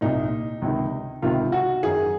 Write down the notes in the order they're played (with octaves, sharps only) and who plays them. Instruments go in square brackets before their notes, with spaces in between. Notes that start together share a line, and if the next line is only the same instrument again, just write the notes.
[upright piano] C2 A#2 D#4
C#2 C3 D#3
C#2 C3 D#3 F4
F#4
F#2 D#3 G#4